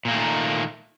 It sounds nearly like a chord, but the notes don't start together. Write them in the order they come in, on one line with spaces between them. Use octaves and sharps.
A#2 A#3 A3 D#3